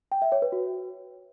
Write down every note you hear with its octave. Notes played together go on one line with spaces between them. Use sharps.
G5
E5
C#5
B4
F#4